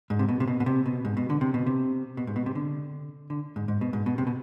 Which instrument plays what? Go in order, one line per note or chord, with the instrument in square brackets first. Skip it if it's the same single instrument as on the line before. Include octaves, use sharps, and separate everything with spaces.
[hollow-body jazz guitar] G#2
C3
B2
C3
B2
B2
C3
B2
G#2
B2
D3
C3
B2
C3
B2
G#2
B2
C3
D3
D3
G#2
G#2
B2
G#2
B2
C3
B2